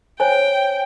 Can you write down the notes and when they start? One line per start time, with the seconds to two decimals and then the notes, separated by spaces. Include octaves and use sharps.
0.20 C5 C#5 G5 G#5